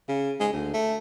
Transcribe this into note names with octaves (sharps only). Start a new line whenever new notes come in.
C#3
G#3
D2
A3